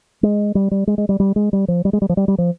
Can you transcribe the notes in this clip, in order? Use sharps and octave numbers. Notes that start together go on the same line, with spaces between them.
G#3
G3
G3
G#3
G#3
G3
G3
G#3
G3
F3
G3
G#3
G3
F3
G3
G3
F3